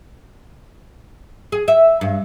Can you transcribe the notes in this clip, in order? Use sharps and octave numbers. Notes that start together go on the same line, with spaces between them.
G#4
E5
G2